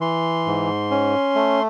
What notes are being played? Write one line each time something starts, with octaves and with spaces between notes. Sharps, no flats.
E3 C6
G#2
C#4
A3